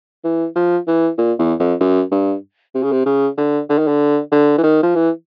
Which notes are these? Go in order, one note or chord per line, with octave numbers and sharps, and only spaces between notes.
E3
F3
E3
A#2
E2
F2
F#2
G2
C3
C#3
C3
C#3
D3
D3
D#3
D3
D3
E3
D#3
F3
E3